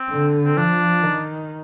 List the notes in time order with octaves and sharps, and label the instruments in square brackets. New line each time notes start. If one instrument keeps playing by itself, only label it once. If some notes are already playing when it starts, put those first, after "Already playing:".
Already playing: [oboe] C4
[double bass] D3
[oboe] C4
[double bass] F3 [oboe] D4
[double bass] D#3